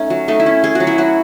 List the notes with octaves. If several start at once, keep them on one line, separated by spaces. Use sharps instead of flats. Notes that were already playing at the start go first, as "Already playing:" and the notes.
Already playing: A3 C#4 D#4
F#3
A3 D#4
E4
C#4
A3 G#4
F#4
F#3
E4
F#3 F#4